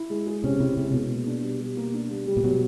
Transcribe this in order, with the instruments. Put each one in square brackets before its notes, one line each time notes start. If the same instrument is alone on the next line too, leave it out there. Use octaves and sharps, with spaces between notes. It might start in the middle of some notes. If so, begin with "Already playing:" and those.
Already playing: [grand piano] E4
G#3
G#4
[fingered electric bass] C3 [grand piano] C#4
[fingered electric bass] C3 [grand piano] E4
[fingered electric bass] C3 [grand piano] G#3
[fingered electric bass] B2 [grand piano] G#4
[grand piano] A#3
D4
G3
G3
A#3
D4
G3
G3
[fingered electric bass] A#2
[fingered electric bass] B2 [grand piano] F#3